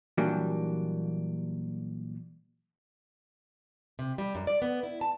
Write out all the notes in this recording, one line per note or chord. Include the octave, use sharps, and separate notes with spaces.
A#2 E3 F#3 G3 A#3 D4
C3
G3
F#2
D5
B3
E4
A5